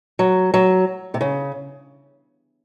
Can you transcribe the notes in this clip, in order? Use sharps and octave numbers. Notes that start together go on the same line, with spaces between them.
F#3
F#3
C3
C#3